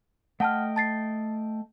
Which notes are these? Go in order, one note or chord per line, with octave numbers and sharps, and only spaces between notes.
A3 D#5 F#5 G5 A5 F6
A5 A6 C7